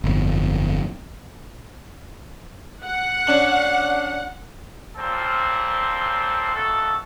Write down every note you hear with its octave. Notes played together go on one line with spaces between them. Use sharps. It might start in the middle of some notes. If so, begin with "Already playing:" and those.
G1 F2
F#5
C#4 D4 F#7
A#2 C#3 F3 C4 A4 C5
D#2 A3 F#4 A4